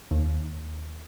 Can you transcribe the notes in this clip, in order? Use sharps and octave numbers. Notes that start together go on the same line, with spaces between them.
D#2